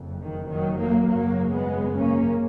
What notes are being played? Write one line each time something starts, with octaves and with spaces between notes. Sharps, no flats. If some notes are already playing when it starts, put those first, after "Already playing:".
Already playing: F#1 F2
D#3
D#3 F#3
F#3 A#3
G#1 F#2 C#3 F#3 A#3
G#3 B3
A#3 C#4